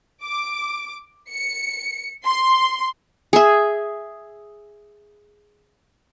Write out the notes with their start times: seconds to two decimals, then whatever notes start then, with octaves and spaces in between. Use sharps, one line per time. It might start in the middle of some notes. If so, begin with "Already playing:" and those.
0.23 D6
1.31 C#7
2.26 C6
3.33 G#4 E5